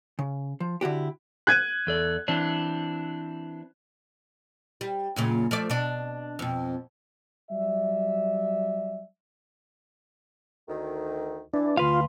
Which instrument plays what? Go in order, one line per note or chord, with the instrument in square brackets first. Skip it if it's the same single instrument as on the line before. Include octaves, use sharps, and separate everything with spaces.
[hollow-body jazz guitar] C#3
F3
D3 E4 F#4 G4
[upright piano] F#6 G#6 D#7
[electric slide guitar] E2 A4 D5
E3 C4 D4
[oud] G3
F#2 A#2 C#3
F3 A3 D5
B2 D4
F2 B2
[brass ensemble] F#3 G3 D5 E5
[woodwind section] D2 D#3
[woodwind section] E3 [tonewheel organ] D4
[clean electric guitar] D2 B4 F5 [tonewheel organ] F4 [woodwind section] C6